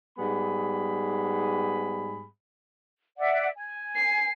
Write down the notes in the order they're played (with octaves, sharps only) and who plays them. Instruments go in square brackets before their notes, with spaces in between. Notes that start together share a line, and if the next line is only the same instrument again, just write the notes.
[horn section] G#2 G3 B3 G#4 B5
[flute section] D5 E5 F#5
G#5
[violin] C7